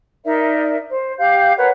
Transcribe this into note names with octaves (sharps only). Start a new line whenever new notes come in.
D#4 A#4 D5 E5
C5
G4 F5 G6
A#4 B4 C#5 F#5